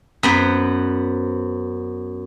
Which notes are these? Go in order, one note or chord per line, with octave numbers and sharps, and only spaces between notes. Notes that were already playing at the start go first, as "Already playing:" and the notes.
F#2 B3 C5